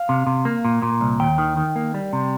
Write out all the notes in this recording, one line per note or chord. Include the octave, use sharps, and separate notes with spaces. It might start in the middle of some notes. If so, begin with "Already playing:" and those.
Already playing: F5
C3
C3
A#3
A#2
A#2
C2
D#2 G5
D#3
D#3
A#3
G3
C3